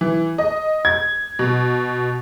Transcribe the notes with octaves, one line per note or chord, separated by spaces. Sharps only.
E3
D#5
G#6
B2